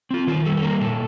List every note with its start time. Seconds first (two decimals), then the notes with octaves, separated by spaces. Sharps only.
0.11 C4 F4
0.27 D#3 F4
0.45 G3 A4
0.57 A4
0.63 A#3 A#4
0.81 A#2 A4